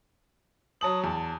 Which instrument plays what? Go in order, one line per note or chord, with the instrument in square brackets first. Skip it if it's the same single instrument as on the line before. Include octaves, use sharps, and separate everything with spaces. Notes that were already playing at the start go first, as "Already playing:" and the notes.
[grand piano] F#3 A5 F#7 [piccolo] D#6
[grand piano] E2 [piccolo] A5